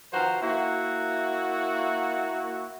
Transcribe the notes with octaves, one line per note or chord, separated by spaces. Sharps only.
D#3 F3 F#4 B4 C5 A#5
A#3 E4 F#4